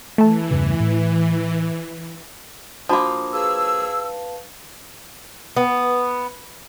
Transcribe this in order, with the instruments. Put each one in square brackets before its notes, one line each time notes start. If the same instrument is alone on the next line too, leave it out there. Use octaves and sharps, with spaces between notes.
[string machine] E3 [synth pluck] A3 A5
[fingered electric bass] E2 G2 C#3
A2
[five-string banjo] F3 A#3 [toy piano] D4 F#4 B5
[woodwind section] G#4 E6 [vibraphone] B4 F5 A5
[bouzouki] B3